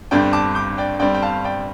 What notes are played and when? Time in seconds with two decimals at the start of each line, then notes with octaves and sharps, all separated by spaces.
0.11 G1 G2 G3 C4 D5 G5
0.33 A5 D6
0.55 D6 G6
0.78 D5 G5
0.99 G1 G2 G3 C4 D5 G5
1.14 G5
1.22 F5 A5
1.44 D5 G5